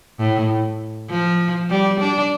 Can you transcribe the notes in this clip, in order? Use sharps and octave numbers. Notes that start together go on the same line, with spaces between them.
A2
F3
G3
D4